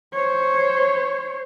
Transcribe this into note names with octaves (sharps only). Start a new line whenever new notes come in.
C5 C#5